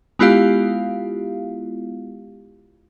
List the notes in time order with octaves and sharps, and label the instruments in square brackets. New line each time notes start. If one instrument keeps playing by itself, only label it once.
[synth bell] G#3 B3 E4 F4 G4 F5